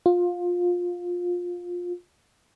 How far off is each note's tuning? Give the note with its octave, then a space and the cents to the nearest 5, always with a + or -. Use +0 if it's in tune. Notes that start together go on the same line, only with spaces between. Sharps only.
F4 +20